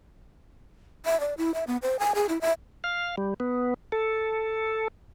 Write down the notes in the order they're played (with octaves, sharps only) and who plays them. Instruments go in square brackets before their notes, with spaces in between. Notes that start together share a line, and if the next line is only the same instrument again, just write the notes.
[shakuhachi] E5
D5
E4
E5
B3
C5
G#5
G#4
E4
E5
[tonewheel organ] F5
G3
B3
A4